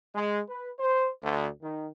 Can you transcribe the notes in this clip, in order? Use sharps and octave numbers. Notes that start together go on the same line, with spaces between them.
G#3
B4
C5
D2
D#3